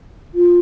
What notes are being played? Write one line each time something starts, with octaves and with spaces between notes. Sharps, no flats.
F4